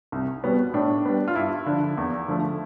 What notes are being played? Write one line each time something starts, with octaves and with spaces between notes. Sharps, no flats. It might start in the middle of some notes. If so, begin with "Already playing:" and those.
C2
B2 G3 B3
A2 D4
G3 B3
F4
G2 E4
D3 F3
E2
D3 F3 A3